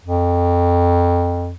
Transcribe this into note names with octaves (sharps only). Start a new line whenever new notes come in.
F2